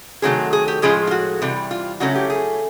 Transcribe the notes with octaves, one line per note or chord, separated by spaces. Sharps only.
C3 D#3 F#3 A3 G#4
G#4
G4
A2 F3 G#3 C#4 F4 G#4
F4
F#4
C3 E3 G3
F4
C#3 F#3 A3 C#4 E4 F#4
G4
G#4